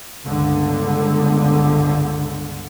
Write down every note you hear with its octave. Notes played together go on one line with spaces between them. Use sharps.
G1 C#2 D3